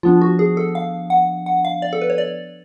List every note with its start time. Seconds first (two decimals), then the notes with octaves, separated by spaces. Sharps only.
0.03 F3 B3 D4 F4
0.21 F#4
0.39 G#4
0.57 A4
0.75 F5
1.10 F#5
1.46 F#5
1.65 F5
1.82 D5
1.93 A4
2.01 B4
2.10 C#5
2.18 D5